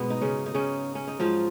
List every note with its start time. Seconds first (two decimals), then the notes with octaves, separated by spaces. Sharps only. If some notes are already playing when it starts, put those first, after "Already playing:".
Already playing: G#2 B2 F#3 B3
0.10 D#4
0.21 C#3 C#4
0.46 D#4
0.54 C#3 C#4
0.95 C#4
1.07 D#4
1.19 G#2 F3 F#3 F4